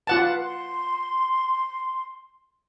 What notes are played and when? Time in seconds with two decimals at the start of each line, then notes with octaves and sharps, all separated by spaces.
0.07 F4 B4 F#5 A5
0.42 C6